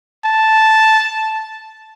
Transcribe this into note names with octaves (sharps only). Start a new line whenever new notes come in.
A5